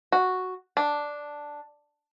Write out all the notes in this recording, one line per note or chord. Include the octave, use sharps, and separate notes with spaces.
F#4
D4